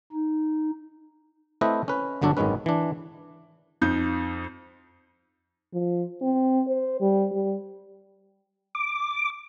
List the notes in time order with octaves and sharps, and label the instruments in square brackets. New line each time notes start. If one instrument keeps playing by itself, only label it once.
[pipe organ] D#4
[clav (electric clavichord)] A3 C4 E4 B4 C5 D#5
C#4 B4
G1 D3 F#3 D4 F#4 A4
G#1 F#2 D#3 G#3 C#4 B4
E3 D4
[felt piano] F2 D#4 G6
[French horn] F3
C4
C5
G3
G3
[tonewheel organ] D6